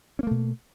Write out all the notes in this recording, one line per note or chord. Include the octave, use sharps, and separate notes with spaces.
B2 A3 A#3 C#4